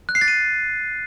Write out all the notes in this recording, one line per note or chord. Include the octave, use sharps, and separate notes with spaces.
F#6
C7
A6
D#7